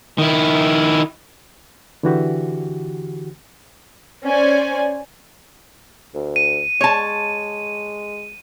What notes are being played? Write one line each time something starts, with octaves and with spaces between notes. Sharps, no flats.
D#3 E4
D3 E3 F#4 G4
C#4 C5 D5 G#5
D2
D#7
G#3 C#5 A5